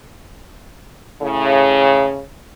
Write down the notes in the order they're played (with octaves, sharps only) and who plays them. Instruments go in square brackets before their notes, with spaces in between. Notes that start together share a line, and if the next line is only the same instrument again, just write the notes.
[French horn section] A2 C#3